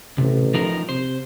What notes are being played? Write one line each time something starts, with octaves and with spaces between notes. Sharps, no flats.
A1 C3
F3 D#4 A#4
C3 C5